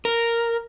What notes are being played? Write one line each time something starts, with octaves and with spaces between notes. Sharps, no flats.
A#4